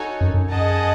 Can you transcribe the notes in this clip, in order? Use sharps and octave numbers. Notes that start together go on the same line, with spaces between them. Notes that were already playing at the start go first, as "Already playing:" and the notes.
Already playing: D#4 F#4 A4 C#5 G#5
F#2
F#2
G#4 D#5 F#5 A5